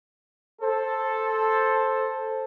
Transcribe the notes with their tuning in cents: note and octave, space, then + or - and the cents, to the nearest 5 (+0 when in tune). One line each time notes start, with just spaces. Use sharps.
A4 +0 C5 +10